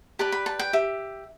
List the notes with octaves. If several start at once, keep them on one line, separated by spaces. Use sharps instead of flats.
G4 B4 D5 A5
B5
A5
G5
G4 E5